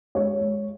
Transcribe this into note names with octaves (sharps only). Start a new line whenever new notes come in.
G#3 C#5
G#3